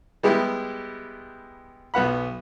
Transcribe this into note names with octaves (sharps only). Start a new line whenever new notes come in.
G3 G#3 B3 E4 G4
B1 B3 F#5 B5